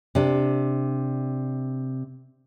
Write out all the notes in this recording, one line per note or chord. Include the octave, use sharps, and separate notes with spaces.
C3 D4